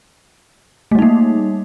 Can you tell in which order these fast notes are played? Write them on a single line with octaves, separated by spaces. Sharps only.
A3 G3 D#4 A#3